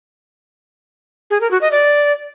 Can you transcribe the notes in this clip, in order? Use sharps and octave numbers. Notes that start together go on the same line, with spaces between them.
G#4
A#4
F#4
D#5
D5